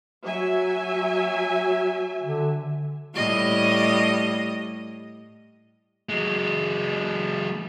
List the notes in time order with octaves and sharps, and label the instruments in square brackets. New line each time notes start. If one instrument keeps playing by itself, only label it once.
[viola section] F#3 E5 G#5
[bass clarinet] D3
[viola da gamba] A2 G3 D#5
[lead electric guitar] F#3 G#3